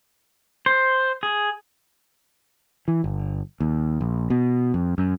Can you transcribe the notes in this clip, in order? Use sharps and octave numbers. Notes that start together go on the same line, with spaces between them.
C5
G#4
E3
G1
D#2
A#1
B2
F2
F#2